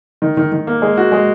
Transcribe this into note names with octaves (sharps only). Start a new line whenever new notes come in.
D#3
D#3
D#3
A#3
G#3
F#4
G#3